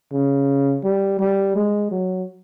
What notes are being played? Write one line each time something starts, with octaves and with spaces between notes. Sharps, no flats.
C#3
G3
G3
G#3
F#3